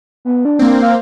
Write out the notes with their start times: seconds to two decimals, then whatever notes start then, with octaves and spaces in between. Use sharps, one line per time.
0.25 B3
0.45 D4
0.59 A#3 C4
0.82 F5